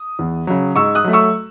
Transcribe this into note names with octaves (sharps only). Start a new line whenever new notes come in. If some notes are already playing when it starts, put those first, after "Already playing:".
Already playing: D#6
E2
C#3 F#3
G#2 C#6 E6
D#6 F#6
F#3 A3
C#6 E6